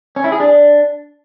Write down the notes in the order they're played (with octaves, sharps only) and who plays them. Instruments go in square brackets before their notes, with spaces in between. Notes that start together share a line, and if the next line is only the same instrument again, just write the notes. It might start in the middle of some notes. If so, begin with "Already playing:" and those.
[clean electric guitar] C#4
E4
G#4
D4